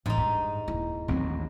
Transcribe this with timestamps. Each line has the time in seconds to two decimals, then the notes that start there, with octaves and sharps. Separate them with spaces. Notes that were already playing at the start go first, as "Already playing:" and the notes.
0.06 A1 G#2 E3 D#4
0.18 G2
0.68 D#1 E4
1.08 A1 D#2 F#3 C4 D#4